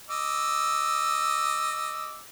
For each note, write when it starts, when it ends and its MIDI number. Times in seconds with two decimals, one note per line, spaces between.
0.10 2.20 75
0.10 2.20 86
0.10 2.20 88